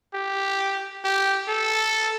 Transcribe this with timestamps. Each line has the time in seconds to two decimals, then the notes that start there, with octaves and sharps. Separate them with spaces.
0.14 G4
1.04 G4
1.48 A4